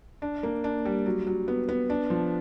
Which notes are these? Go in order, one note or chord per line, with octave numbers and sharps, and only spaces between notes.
D4
A#3
D4
G3
F#3
F#3
B3
B3
D4
F3